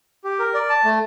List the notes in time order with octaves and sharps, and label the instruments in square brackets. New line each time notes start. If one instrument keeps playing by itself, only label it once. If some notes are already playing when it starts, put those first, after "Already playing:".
[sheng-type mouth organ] G4
A#4
D5
A5
A3